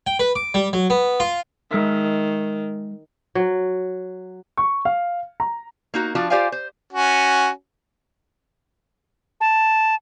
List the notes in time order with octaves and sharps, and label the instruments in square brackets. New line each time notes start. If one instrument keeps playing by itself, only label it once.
[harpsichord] G5
B4
D6
G3
F#3
B3
F4
[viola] D#3 [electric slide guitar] G#3 A#4 E5
[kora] F#3
[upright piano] C#6
F5
A#5
[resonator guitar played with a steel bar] A#3 D#4 F#4
F3 D4 F4 F#4
F4 G4 C5 D5 F5 G#5
C5
[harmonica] C#4 F#4
[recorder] A5